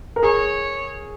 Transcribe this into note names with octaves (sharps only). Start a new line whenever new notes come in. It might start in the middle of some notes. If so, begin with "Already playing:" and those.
A#4
G#4 C#5